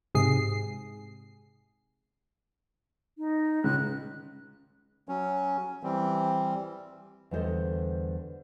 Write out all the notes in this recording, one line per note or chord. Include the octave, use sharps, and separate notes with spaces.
G#2 C3 G#4 C7
D#4
C#2 F#6
F#3 C#4
E3 G3 C4
E2 D3 G3 A4 C5 D#5